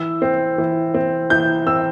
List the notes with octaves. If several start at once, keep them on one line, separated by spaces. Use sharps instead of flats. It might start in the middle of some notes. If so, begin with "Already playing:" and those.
Already playing: E3 E6
C4
E3
C4
E3 G6
C4 E6